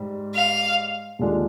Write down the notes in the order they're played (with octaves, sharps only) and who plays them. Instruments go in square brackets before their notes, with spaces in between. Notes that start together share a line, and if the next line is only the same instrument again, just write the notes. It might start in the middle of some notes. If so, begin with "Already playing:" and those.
Already playing: [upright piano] G#2 G3
[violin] F5
[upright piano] D#2 D3 G#3 D4 F4